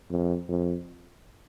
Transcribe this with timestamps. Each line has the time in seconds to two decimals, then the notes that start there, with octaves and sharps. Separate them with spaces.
0.10 F2
0.48 F2